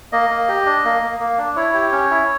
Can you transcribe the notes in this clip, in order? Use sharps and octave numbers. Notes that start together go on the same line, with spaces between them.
A#3 D#5
A#3
G4
D4
A#3
A#3
A#3
D4
E4 C#5
G4
C#4
E4